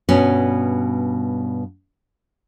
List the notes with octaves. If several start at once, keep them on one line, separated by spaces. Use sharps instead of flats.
G2 B2 B3 C#4